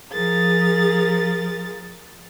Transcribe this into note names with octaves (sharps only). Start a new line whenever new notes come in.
F3 G#4 A#4 A6